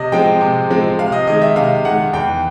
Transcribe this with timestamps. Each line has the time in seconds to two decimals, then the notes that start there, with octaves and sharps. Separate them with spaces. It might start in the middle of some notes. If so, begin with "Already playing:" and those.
Already playing: C3 D#5
0.12 F3 G#3 C4 G5
0.41 C3
0.70 F3 G#3 C4
0.99 C3 F5
1.12 D#5
1.27 D#3 G#3 D#5
1.42 E5
1.56 C3 F5
1.85 D#3 G#3 F#5
2.13 E2 G5